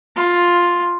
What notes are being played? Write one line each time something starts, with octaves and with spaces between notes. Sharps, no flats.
F4